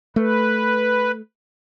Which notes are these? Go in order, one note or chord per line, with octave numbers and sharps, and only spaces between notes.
A3 B4